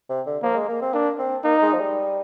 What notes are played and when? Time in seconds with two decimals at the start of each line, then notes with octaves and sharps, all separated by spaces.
0.09 C3
0.26 D3
0.43 F3 A#3
0.55 G#3
0.68 A#3
0.82 C4
0.94 A#3 D4
1.19 C4
1.44 A#3 D#4
1.62 G#3
1.73 F3
1.79 G3